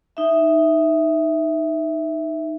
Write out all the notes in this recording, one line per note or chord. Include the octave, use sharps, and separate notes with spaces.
D#4 E5